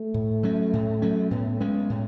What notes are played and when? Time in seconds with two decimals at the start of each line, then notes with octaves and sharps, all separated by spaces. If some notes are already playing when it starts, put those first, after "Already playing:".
Already playing: A3
0.14 A2
0.43 F#3 C#4
0.73 A2
1.02 F#3 C#4
1.31 A2 B3
1.60 G#3 B3 C#4
1.90 A2